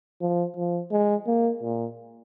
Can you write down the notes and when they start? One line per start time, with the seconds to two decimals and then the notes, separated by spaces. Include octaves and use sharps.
0.21 F3
0.57 F3
0.91 G#3
1.27 A#3
1.63 A#2